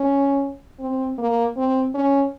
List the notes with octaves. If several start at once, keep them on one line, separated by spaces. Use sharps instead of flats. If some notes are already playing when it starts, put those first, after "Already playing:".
Already playing: C#4
C4
A#3
C4
C#4